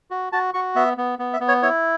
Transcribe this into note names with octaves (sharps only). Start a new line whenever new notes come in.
F#4
F#4 A5
F#4 C#6
B3 E5
B3
B3
E5
B3
C#5
E4 C#5